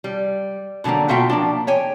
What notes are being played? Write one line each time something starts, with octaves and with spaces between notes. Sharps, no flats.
G3
B2 D3 F#3 G3 A#3
B2 F4 F#4 E5 F5 G5
F3 A#3 D4
C#5 G5 G#5